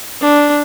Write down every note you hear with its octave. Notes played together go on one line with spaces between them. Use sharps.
D4